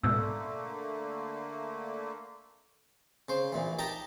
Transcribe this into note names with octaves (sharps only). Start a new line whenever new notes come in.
G#2 B2 D3 A3 A#3 E6
C#3 C5
A#1 A#2 E3
D#4 G4 G5 A5 A#5